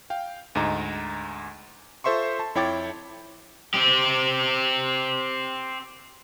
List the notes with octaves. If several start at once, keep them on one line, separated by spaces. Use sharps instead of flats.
F5 G5
D2 G#2 D#5 A#5
F4 A4 C5 E5 C6 C#6
A5
F2 E4 C#5 G5 D6 A6
C4 G4